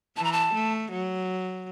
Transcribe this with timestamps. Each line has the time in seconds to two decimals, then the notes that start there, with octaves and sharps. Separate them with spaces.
0.17 E3 A5
0.24 A#5
0.33 A5
0.54 A3
0.91 F#3